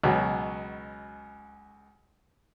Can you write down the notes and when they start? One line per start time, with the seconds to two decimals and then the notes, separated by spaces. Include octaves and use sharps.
0.03 C#2 B2 F#3